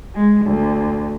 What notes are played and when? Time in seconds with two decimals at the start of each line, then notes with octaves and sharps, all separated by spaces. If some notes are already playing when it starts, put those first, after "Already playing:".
0.14 G#3
0.45 D2